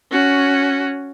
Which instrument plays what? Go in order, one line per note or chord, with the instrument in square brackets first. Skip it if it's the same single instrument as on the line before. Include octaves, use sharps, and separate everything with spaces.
[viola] C#4 F#4